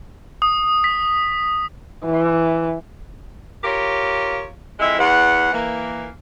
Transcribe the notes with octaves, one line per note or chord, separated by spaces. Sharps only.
D#6
B6
E3
F4 G4 A#4 C#5
F2 G#3 E4 E5
E2 F#5
E3 A#3